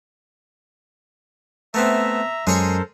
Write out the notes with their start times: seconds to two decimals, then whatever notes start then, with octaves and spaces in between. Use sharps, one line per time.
1.74 A3 B3 C4 E5 A#5
2.47 F#2 G#3 A4 A#4 C5 C#5 G#5